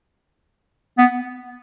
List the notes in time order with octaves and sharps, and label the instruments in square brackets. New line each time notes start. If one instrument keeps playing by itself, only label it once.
[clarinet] B3